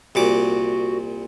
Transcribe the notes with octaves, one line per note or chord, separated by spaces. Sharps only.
C2 A#2 F#4 D6